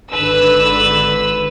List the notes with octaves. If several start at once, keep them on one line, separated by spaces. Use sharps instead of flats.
G#1 D3 B4 E6